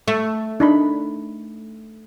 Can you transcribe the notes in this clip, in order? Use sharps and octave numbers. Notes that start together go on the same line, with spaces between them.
A3 C#6
D4 D#4 B5